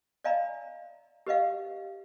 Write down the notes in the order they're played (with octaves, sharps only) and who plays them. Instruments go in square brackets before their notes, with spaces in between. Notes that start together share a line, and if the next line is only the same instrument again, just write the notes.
[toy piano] D5 D#5 F5 G#5 A#5 B5
G4 B4 D#5 F5